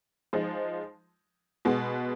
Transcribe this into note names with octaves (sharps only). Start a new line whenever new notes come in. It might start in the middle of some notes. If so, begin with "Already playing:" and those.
F3 G#3 D#4
B2 G#3 B3